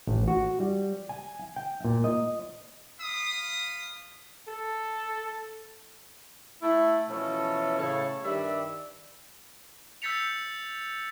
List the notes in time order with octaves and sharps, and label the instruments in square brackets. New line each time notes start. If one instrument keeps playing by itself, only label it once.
[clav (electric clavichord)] A1
F#4
G3
G#5
G5
A#2
D#5
[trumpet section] F5 B5 D#6
[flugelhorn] A4
[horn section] A3 E4
B2 E3 F3 C#4 A4
A2 C#3 A4 C#5
G2 D#3 G3 D5 E5
[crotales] E6 G6 A6 B6 C#7 F7